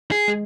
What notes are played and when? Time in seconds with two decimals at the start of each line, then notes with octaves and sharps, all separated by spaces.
0.11 G#4
0.28 G#3